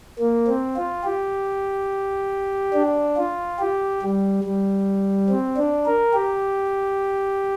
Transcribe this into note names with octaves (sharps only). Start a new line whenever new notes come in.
A#3
C4
F4
G4
D4
F4
G4
G3
G3
C4
D4
A#4
G4